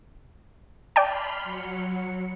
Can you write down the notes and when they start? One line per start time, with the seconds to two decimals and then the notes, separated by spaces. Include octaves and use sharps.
0.96 D5 G5 A5 B5 C6 F6
1.43 F#3 C#7